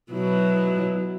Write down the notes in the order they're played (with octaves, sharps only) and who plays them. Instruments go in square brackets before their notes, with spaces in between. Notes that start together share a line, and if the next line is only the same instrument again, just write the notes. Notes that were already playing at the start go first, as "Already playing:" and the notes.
[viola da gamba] B2 F#3 E4